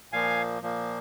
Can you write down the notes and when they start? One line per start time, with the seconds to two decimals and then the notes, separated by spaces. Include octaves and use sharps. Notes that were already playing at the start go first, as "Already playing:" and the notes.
0.12 A#2 F3 A#3 F5 G#5
0.62 A#2 F3 A#3